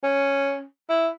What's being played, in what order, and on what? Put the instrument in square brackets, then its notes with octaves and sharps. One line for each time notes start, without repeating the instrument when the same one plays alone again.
[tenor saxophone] C#4
E4